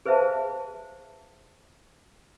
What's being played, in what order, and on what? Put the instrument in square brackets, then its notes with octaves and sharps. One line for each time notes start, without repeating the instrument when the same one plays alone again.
[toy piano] G#4 B4 C5 E5 F5 A5